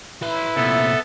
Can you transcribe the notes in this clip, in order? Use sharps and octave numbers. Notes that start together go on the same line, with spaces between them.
E4 B4 C6
C2 A#2 B3 A4 E5